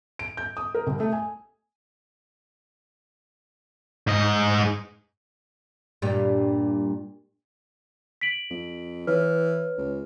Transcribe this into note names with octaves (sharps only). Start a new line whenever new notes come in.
D7
G6
D#6
A#4
C2
A3
G#5
G#2 D#5
G2 A#2 G3
B6 D7 F#7
F2
E3 B4 C#5 F6
C#2